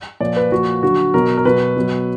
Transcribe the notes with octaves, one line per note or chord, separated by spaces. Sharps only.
A#2 F3 D5
B4
A#2 F3 F#4
D3 F#3 F#4
B2 F#3 A#4
A#4
B2 F#3 B4
B2 F#3